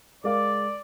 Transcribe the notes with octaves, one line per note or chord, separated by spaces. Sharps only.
G#3 A#4 D5 F5